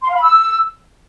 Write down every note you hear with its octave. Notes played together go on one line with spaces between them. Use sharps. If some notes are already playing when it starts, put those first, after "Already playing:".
C6
F5
B5
E6